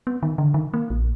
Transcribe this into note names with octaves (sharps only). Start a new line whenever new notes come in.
B3
D#3
D3
D#3
A#3
A#1